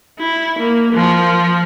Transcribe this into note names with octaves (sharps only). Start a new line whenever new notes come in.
E4
A#3
F3